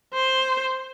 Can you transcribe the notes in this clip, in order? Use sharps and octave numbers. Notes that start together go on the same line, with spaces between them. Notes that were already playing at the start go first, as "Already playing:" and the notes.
C5